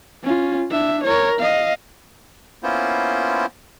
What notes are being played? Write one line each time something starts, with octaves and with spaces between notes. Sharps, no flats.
C#4 F4
D4 E5
A#4 C#5
D#5 F5
A#3 B3 C#4 E4 F4 C5